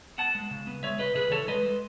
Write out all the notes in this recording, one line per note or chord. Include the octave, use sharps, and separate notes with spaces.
B3 F#5 A5
G#3
C#3
B3
G#3 C#5 E5
C#3 B4 D#5
C#3 G#4 B4
E3 A4 C#5
G#3 B4 D#5
G#3